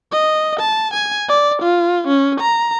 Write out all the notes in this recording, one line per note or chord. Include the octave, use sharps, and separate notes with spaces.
D#5
A5
G#5
D5
F4
C#4
A#5